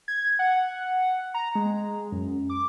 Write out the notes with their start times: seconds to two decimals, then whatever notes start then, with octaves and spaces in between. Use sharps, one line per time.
0.08 G#6
0.39 F#5
1.34 A#5
1.55 G#3
2.12 F#2
2.50 D6